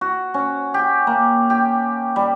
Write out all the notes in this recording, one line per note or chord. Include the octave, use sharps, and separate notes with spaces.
F#4
C#4
G4
A#3
G4
G3